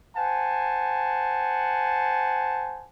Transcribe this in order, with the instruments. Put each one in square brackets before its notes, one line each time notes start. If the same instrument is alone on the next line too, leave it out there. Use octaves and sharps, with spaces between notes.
[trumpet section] C5 F#5 G#5 A5